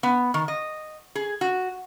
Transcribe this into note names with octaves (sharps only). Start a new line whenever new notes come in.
B3
D#3
D#5
G#4
F#4